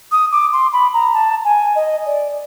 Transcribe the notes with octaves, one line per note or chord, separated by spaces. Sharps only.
D#6
D6
C6
B5
A#5
A5
G#5
D#5
D5